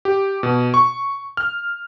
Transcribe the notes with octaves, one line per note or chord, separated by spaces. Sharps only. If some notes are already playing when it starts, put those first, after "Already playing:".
G4
B2
C#6
F6